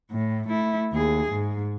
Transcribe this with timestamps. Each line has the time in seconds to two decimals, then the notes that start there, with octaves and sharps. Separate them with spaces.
0.11 A2
0.48 A3 E4
0.93 D#2 G#4
1.31 G#2